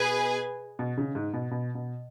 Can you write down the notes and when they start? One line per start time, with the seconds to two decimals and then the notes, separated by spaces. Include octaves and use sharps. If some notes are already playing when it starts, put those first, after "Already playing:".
Already playing: B2 G#4 B4 G#5
0.79 B2
0.98 C#3
1.15 G#2
1.33 B2
1.51 B2
1.75 B2